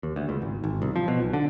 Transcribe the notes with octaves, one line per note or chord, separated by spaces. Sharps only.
D#2
D2
C#2
G#1
G#1
C2
F3
B2
B1
D3